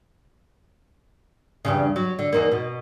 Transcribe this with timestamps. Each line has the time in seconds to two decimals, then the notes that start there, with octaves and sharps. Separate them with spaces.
1.65 E2 G2 C#3
1.96 F#3
2.19 D3
2.33 E2 D#3 A#3
2.52 B2